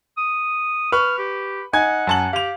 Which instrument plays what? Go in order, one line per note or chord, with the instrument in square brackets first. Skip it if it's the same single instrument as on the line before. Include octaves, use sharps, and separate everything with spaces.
[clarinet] D#6
[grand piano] B4 C#6 [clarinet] F6
[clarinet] G4
[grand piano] D#4 G#5 G#6 [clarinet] F#5
[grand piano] F#2 A5 F#7
[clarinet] G4 [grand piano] F5 F7